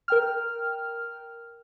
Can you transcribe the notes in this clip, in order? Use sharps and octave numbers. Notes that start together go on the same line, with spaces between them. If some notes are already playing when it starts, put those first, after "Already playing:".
A#4 G5 F6